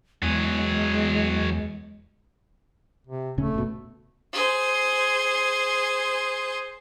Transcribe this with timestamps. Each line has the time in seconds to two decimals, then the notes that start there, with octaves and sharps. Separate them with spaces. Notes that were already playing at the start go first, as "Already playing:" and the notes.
0.23 E2 F#3 G#3 G#4
3.07 C3
3.38 D1 C#3 A3 C#4
3.54 F#1 B2
4.33 G#4 C5